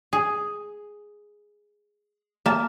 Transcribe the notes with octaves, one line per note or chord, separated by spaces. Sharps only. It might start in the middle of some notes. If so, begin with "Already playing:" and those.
G#4
A#3 A5